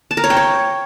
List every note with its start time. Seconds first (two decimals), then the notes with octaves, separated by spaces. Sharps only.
0.11 A5
0.17 A#4
0.24 C#5
0.30 G5
0.37 C#5